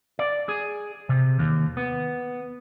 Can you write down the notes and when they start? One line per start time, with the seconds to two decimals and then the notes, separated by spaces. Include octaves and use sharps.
0.19 D5
0.49 G#4
1.09 C3
1.39 D#2
1.77 B3